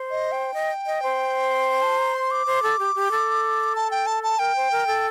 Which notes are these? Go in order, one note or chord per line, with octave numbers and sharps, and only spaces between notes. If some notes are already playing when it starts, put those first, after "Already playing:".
Already playing: C5
D#5
G5
D#5
D#5
C5
A5
A#5
C6
D6
C5
A4
G4
G4
A4
A5
G5
A5
A5
A#4 G5
C5
A#4
A4